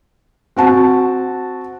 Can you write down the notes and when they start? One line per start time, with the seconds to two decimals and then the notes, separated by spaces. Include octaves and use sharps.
0.56 C4 F#4 A5